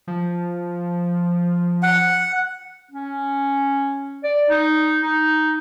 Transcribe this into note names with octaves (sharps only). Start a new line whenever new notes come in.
F3
F#5
C#4
D5
D#4
D#4